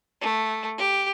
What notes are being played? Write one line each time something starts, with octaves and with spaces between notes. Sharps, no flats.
A3
G4